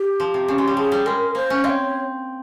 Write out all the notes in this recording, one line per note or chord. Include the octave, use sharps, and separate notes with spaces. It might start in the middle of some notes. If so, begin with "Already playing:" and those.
Already playing: G4
F3
C3
C#3
G#3
G3
F3 G#4
G3
G#3 A#4
A#3 C5
C#4
C4 F5
C#5